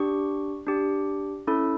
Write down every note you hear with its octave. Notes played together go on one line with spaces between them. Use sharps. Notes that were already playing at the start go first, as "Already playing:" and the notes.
Already playing: D4 G4 C#6
D4 G4
C#4 E4 A4